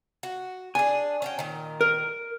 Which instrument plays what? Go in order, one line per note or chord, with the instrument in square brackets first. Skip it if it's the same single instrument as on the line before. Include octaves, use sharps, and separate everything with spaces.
[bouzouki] F#4
[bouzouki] D4 G#4 [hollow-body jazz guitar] G#5
[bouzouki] C#4 F#4 G5
A#2 D#3
[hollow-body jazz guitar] A#4